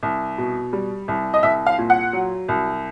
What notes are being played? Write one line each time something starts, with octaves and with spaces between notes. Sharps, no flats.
C2
B2
G3
C2
D#5
C2 E5
F5
A#2
F#5
F#3
C2